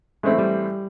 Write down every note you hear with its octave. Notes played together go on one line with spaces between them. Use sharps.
A2 E3 G#3 A3 C4 E4
G3